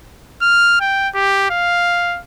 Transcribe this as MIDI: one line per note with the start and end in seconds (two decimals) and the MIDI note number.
0.42 0.78 89
0.80 1.09 79
1.14 1.47 67
1.50 2.20 77